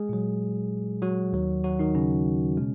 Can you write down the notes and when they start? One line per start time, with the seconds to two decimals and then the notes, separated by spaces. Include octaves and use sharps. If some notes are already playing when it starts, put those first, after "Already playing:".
Already playing: G#3 G#4
0.09 A#2 F#3
1.02 F#3 F#4
1.33 D#2 D#3 F#3
1.64 F#3 F#4
1.79 D#3 D#4
1.95 C#3 C#4
2.57 B2 G#3